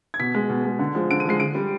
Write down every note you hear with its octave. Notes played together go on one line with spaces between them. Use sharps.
G#6
B2 B6
G#3
B2
G#3
D3
F3 G#3
D3 D7
D#7
F3 G#3 C7
D3 D7
G3